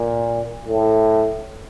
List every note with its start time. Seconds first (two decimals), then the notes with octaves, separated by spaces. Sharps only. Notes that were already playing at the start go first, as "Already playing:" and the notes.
Already playing: A#2
0.68 A2